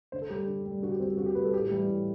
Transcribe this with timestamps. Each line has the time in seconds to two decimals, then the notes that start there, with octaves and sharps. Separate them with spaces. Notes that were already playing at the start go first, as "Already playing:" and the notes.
0.12 D3 C5
0.21 A4
0.29 G3 G4
0.47 D3
0.66 G3
0.82 D3 F#4
0.91 G4
1.00 G3 C4
1.17 D3 F#4
1.26 G4
1.35 G3 B4
1.45 A4
1.53 A2 G4
1.71 E3 G3
1.88 A2